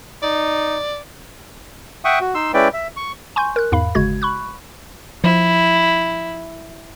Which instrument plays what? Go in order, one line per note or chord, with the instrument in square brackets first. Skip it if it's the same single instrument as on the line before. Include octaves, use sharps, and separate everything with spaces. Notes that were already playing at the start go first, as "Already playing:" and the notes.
[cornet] D#4 [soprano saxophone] D5
[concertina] E5 F#5 G5 C#6 D#6
F#4
D#4 C6 E6
G#3 C#4 E4 B4 D5 G5
E5
C#6
[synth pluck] G#5 C6 C#6 G6
A#4 F#6
E2 G#2 F5 B5
G1 C#3 G#3 F#4 G#6
B5 C#6 F#6
[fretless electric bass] F3 [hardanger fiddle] E4